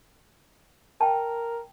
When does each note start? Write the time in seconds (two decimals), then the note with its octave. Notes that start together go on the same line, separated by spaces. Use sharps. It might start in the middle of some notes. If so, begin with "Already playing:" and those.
1.01 A#4 G5 A5